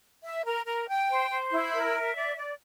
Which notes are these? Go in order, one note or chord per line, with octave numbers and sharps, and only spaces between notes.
E5
A#4
A#4
G5
C5
C5
E4
A#4
E5
D5
D5